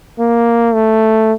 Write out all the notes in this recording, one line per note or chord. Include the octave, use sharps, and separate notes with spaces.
A#3
A3